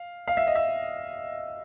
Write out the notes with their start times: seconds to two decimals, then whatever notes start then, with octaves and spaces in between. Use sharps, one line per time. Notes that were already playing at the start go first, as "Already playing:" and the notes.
Already playing: F5
0.28 F5
0.37 E5
0.47 D#5
0.55 E5